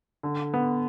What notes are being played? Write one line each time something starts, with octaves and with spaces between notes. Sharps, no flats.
D3
B3